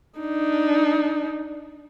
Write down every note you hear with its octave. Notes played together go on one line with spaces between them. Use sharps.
D4 D#4